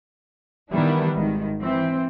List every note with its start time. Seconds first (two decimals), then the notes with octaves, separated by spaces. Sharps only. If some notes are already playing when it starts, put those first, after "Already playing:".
0.73 D#3 E3 G3 B3 D4 E4
1.16 G#1 D#3
1.60 E3 C4